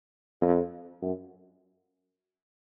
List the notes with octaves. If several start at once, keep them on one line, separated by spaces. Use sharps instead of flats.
F2
F#2